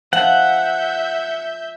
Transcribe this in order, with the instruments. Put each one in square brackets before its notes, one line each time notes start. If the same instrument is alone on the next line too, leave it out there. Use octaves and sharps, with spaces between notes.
[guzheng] F3 [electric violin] E5 G6 [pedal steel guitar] F#5